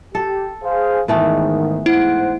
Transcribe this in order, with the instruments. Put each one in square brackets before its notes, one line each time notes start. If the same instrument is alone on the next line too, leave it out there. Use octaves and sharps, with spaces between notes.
[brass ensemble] G4 [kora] A4
[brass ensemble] G#4 C5 F5
[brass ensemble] G#2 D#3 [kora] E3 A3 B3
[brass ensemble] G#2 C5 F#5 [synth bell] E4